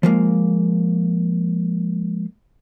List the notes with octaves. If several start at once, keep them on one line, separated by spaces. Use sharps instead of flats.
F3 G#3 A#3